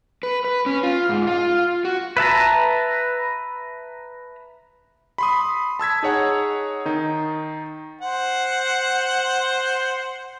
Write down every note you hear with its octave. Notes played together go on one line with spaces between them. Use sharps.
B4
B4
C#4
F4
G#2
F4
F#4
B4 E5 A5 A#5
B5 C6 D#6
A5 E6 G#6 B6
D#4 G#4 C#5 F#5
D#3 D#4
C5 F#5